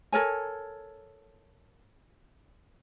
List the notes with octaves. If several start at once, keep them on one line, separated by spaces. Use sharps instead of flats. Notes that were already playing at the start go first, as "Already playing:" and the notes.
A4 A#4 C#5 G#5